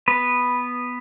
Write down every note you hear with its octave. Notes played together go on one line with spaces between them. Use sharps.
B3 B4